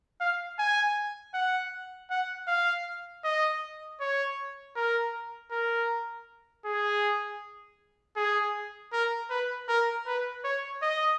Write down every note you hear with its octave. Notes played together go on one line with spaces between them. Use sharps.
F5
G#5
F#5
F#5
F5
D#5
C#5
A#4
A#4
G#4
G#4
A#4
B4
A#4
B4
C#5
D#5